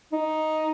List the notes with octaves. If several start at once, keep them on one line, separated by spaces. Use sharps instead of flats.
D#4